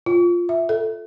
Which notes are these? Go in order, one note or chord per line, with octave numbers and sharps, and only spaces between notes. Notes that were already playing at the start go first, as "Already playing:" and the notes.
F4
E5
A4